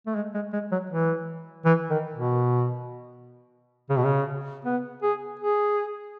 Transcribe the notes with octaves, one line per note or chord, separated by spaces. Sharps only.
A3
G#3
G#3
G#3
F#3
E3
E3
D#3
B2
C#3
B2
C#3
B3
G#4
G#4